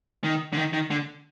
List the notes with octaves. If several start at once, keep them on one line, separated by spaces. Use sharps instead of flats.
D#3
D3
D#3
D#3
D3